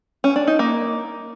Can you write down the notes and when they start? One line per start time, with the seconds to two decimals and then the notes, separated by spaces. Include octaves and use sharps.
0.24 C#4
0.36 D4
0.47 D#4
0.59 A#3